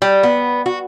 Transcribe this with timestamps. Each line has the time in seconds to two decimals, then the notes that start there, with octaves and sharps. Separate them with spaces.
0.02 G3
0.23 B3
0.66 F#4